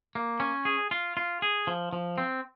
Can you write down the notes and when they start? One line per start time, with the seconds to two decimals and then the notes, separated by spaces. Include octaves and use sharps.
0.15 A#3
0.40 C#4
0.65 G#4
0.91 F4
1.17 F4
1.42 G#4
1.67 F3
1.93 F3
2.18 C4